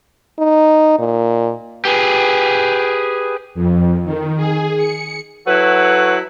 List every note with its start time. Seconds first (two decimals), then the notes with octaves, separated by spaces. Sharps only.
0.39 D#4
0.99 A#2
1.85 G4 G#4 B4
3.55 F2
4.04 D#3
4.37 G#4
4.77 C#7
5.47 F#3 E4 F#4 A4 B4 C#5